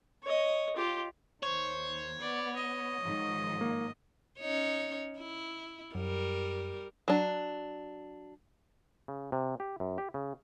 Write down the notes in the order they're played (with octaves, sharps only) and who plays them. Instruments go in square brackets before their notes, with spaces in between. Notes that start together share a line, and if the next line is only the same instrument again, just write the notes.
[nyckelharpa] C#5 D#5
F4 G4
[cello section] D#2 [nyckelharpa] C5 [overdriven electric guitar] C#5
[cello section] B3 [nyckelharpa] D5
[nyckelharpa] D#5
[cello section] G#2 D#3 F3
[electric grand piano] A#3
[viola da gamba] C#4 D#4 C#5
E4
[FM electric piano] F#2 [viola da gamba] G3 A#4
[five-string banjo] F#3 D4
[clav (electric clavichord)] C#3
C3
G4
F#2
G4
C#3